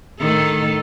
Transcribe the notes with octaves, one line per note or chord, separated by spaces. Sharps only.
A2 D#3 A4